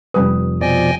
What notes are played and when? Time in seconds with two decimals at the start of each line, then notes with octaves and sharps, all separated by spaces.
0.14 F1 G3 B4 D#6
0.61 B2 F3 D5 D#5 G5 G#5